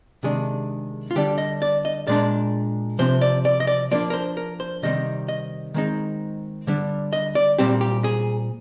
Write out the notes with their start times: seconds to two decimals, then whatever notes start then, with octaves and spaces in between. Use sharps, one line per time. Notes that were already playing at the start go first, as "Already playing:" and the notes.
0.23 C3 D#3 G#3 D4 G#4
1.11 F4
1.16 D3 G3 D4 G4
1.38 D#5
1.62 D5
1.85 D#5
2.07 A#2 G#3 D4 D5
2.99 C3 F3 C4 C5
3.21 D5
3.45 D5
3.60 D#5
3.67 D5
3.91 F3 A#3 D4 D5
4.10 A#4
4.13 C5
4.37 A#4
4.60 C5
4.83 C3 D#3 G3 C4 D#4 D#5
5.28 D#5
5.74 D#3 G#3 C4 D#4
6.67 D3 G3 D4
7.13 D#5
7.35 D5
7.59 A#2 G3 C4 G4
7.81 G4
8.04 G#4